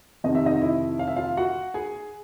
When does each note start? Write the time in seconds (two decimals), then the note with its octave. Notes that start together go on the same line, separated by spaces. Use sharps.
0.24 F2 C3 D#3 D#5
0.35 E5
0.45 D#4 D#5
0.62 E4 E5
0.99 F5
1.08 E5
1.16 F4 F5
1.37 F#4 F#5
1.74 G#4 G#5